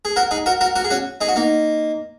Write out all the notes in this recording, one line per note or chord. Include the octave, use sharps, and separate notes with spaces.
G#4
F#4 A#4
D#4 G#4
F#4 A#4
F#4 A#4
F#4 A#4
G#4
C#4 F#4
D#4 G#4
F#4
A#3 D#4